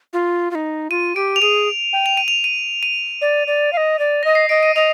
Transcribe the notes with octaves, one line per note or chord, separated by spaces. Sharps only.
F4
F4
D#4
F4 D#7
G4 D7
F7
G#4 D#7
G5
F7
D#7
F7
D#7
D#7
D5
D5
F5
D#5
D5
D#5 A#6
C7
D#5 D7
D#7
D#5 F7